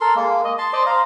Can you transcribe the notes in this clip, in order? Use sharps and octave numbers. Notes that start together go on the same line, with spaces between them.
A4 A#4 C6
G#3 A#3
D#5
A5 C6
C5 D5 D#5 A5
C5 F5 A#5